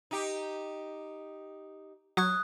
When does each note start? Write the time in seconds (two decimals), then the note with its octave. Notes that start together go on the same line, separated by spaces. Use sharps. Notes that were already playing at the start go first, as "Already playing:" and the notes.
0.11 D#4 G4
2.17 F#3 C#6 D#6 F#6 G#6